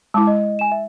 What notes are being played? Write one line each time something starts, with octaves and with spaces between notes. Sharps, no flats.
G#3 E4 A5 D6
D#5
G#5 E7
E5